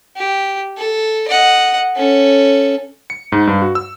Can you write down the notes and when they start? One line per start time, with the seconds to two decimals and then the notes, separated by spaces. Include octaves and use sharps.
0.16 G4
0.77 A4
1.28 D#5 F#5
1.96 C#4 A4
3.10 C#7
3.32 G#2
3.47 G2
3.62 F#4
3.75 E6